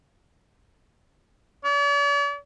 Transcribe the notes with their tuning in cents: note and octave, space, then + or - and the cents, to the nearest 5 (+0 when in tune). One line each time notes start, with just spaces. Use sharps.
D5 -45